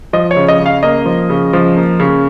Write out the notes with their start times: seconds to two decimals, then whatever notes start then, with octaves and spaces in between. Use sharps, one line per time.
0.13 F3 D#5
0.31 C#5
0.36 C#3
0.48 D#5
0.60 C#3
0.66 F5
0.83 A#3 D#5
1.06 F3
1.30 C#3
1.53 F3
1.76 A#3
2.00 C#3